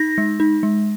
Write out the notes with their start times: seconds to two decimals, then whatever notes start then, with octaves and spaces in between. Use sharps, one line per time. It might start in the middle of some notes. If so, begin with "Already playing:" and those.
Already playing: D#4 A#6
0.18 G#3
0.40 D#4
0.63 G#3